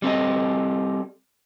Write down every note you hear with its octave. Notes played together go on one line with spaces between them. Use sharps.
G3 C4 A4 D#5